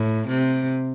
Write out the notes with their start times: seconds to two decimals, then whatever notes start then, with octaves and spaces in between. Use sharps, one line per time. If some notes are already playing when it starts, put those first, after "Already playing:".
Already playing: A2
0.28 C3